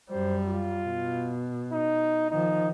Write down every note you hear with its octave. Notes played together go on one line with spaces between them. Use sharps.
F#2 G3 C5
F4
B2
D#4
D#3 F3 D#4